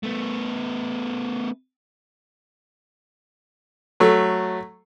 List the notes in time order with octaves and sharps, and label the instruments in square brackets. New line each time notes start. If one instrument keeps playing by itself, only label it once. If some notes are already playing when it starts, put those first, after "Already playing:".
[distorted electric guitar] A3 B3
[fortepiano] F#3 A3